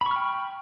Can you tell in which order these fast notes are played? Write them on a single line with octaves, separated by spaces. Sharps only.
B5 C#6 F6 G5